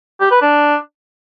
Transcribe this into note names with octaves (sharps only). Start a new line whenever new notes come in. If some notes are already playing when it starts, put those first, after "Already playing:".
G4
B4
D4